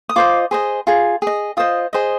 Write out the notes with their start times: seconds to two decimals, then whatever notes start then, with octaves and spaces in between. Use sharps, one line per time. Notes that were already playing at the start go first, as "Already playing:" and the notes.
0.09 D#6
0.16 F4 C5 D#5 D6
0.51 G#4 C5 D#5
0.87 F4 G#4
1.22 G#4 D#5
1.57 F4 C5 D#5 D#6
1.93 G#4 C5 D#5